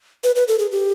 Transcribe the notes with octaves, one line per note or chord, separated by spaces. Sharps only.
B4
B4
A4
G#4
G4